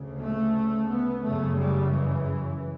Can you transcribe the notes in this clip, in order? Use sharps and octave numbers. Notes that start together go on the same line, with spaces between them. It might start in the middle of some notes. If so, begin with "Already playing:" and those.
Already playing: D2 C#3
A3
B3
F#1 F#2 C#3 A3
G3
E3